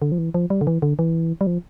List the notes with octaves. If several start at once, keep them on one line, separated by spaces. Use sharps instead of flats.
D3
F3
E3
F3
G3
D3
E3
D3
E3
G3
F3